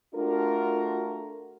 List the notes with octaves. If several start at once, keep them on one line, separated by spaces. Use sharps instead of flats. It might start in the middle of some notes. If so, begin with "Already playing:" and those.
A3 D4 F4 F#4 A#4